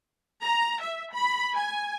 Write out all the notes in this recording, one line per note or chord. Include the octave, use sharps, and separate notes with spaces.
A#5
E5
B5
G#5